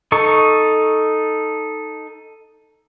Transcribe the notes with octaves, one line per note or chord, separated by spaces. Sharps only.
D#4 A4 C#6